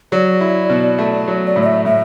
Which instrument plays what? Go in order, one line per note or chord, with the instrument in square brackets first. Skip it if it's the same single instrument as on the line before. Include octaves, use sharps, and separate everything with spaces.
[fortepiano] F#3 [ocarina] D5
[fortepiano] E4
B2
A3
F#3
[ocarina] D5
[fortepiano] A2
[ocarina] D5
E5
[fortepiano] A2 [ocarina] E5